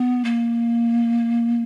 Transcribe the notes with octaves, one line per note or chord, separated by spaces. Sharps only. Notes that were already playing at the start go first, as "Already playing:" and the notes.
Already playing: B3
A#3